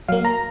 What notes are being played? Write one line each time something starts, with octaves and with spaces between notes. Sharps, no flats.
F#3 A#3 F5
A#5